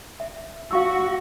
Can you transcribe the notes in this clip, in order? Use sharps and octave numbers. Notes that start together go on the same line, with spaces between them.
E5
F#4 F5 C#6 E6